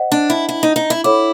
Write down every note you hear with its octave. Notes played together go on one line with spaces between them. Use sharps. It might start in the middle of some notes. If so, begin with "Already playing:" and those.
Already playing: C5 D#5 F#5
D4
E4
E4
D#4
D#4
E4
E4 A4 C#5 F#5 B5 D6